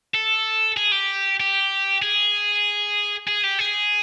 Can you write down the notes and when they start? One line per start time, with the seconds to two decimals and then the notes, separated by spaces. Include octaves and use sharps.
0.15 A4
0.77 G#4
0.92 G4
1.40 G4
2.02 G#4
3.27 G#4
3.43 G4
3.59 G#4